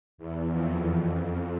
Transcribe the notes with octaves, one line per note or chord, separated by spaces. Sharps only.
E2
F2
F2